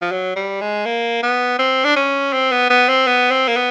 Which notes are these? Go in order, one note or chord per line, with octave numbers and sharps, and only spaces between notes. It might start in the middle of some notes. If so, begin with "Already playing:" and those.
F3
F#3
G3
G#3
A#3
B3
C4
D4
C#4
C4
B3
B3
C4
B3
C4
A#3
B3